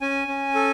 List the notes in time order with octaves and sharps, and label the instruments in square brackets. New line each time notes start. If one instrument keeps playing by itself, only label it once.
[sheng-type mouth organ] C#4 G#5
C#4
A4